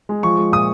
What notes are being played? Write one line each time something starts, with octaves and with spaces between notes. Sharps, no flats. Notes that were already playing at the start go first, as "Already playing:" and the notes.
G#3
F3 C#6
G#3
A#2 D#6